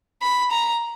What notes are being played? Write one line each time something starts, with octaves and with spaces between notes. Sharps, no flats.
B5
A#5